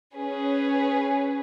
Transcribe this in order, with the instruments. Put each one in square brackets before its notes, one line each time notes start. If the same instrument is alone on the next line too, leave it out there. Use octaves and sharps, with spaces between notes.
[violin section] C#4 G#4 B4